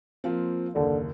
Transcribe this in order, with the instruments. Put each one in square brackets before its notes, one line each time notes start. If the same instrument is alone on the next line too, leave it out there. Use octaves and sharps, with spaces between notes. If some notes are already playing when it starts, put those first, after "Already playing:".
[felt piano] F3 A#3 C4
[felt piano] F#1 D#2 [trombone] D3